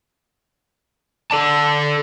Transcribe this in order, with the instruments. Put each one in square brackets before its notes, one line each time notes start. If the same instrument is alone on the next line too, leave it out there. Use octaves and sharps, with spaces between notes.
[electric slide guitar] A4 D5 A5